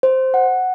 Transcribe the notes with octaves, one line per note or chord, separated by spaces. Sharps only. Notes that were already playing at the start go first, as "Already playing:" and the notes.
C5
F#5